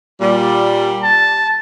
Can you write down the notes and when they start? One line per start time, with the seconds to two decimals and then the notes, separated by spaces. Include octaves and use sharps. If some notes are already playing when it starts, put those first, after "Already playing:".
0.21 A#2 G3
1.03 A5